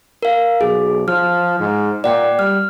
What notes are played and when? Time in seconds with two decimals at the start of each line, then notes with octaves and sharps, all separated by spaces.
0.23 A#4 F5
0.61 B1 G#4
1.08 F3 F6
1.60 G#2
2.04 A#2 D5 F#5 G5
2.39 G3 F6